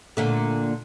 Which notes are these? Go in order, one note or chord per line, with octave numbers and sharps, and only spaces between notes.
A#2 D3 A3